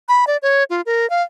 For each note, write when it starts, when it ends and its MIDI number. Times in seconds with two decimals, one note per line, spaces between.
0.09 0.25 83
0.27 0.37 74
0.42 0.64 73
0.70 0.81 65
0.86 1.09 70
1.10 1.22 77